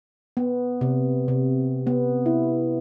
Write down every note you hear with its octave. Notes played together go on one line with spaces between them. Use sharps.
B3
C3
C3
B3
E4